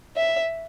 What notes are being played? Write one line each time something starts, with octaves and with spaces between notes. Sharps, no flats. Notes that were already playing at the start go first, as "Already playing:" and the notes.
E5